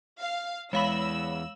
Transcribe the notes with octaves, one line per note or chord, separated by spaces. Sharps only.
F5
E2 G#3 C#5 F5 B5 E6 F#7